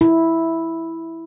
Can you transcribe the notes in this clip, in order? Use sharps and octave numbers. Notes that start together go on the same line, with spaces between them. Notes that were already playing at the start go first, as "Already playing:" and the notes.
E4